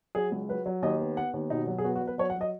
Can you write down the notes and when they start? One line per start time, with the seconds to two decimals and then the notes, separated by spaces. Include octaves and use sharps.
0.15 F#3 G#4
0.32 C#2
0.49 F#3 B4
0.66 F#3
0.82 D#2 D#5
1.01 B3
1.17 B3 F#5
1.34 D#2
1.50 B2 D#4
1.67 F#3
1.78 G#4
1.84 B3 F#4
1.96 F#4
2.02 F#3
2.07 B4
2.18 F#3 C#5
2.30 F#5
2.35 F#3
2.41 D#5